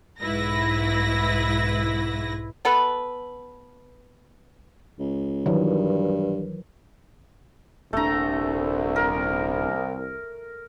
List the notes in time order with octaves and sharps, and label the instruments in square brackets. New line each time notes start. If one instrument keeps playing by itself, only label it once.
[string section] B1 G#2 E4 B4 A#6
[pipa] B3 A4 B4
[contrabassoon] C#2
[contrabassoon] G2 [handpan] D#3 E3 F#3
[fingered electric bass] D#1 D4 [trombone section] C2 [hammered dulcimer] A3 A#5
[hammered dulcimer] A#4